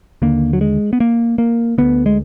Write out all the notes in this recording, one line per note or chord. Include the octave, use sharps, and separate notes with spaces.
D#2 D3 A#3
F#3
G#3
B3
A#3
A#3
D2 D3 B3
G#3